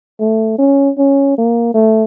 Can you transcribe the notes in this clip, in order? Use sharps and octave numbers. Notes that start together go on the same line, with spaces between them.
A3
C#4
C#4
A#3
A3